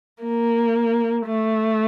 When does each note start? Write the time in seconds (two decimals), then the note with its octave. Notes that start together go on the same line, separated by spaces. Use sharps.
0.23 A#3
1.27 A3